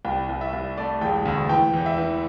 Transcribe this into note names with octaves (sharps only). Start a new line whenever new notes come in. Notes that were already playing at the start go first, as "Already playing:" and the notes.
C2 G5
C2
E5
C2
A3 D5
E1 G5
D2
E3 G5
E2
E5
E3